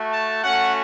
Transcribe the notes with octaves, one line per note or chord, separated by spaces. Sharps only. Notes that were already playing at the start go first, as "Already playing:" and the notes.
Already playing: A3 F#4
A5
A3 C#4 F#4 F#5